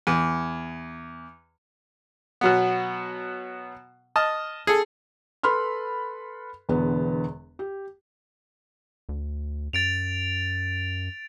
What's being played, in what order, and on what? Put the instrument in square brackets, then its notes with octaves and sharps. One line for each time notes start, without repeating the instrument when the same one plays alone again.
[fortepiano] E2
B2 F#3 B3
D#5 A5 F6
G#4 A4
[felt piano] A4 B4 B5 C6 F6
E1 E2 D3 B3
G4
[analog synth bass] D2
[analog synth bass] F#2 [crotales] A6 D7 F7